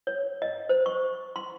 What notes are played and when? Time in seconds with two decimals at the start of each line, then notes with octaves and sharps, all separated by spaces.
0.07 C#5
0.42 D#5
0.69 C5
0.86 C#6
1.36 C6